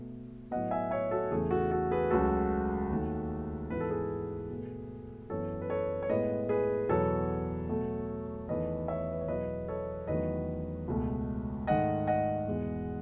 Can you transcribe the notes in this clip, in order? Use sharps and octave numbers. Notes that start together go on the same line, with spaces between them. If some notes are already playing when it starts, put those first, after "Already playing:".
Already playing: B2 A3
A2 F#3 B3 D#5 F#5
E5 G#5
C#5 E5
F#4 A4
E2 C#3 E3 A3 G#4
F#4 A4
F#4 A4
G#4 B4
C#2 C#3 F#3 A3 F#4 A4
D#2 D#3 A3
G#2 E3 B3 B4
A4
G#4 B4
B2 A3
F#2 E3 B3 A4 C#5
B4
A4 C#5
C#5
A2 G#3 B3 B4 D#5
G#4 B4
E2 B2 F#3 B3 A4 C#5
B2 F#3 A3
E2 D#3 A3 B4 D#5
C#5 E5
B4
C#5
E2 B2 F#3 B4 D#5
A4 C#5
E2 D#3 F#3 A3 B4 D#5
C#2 B2 A3
G#2 D#3 A3 D#5 F#5
D#5 F#5
E2 B2 G#3